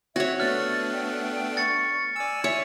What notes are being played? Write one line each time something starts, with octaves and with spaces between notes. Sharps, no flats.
C4 F#4 C#5 E5
A3 B3 D4 F6 A6
G5
C#6 A6 C#7
D5 G#5 E6
C#5 E5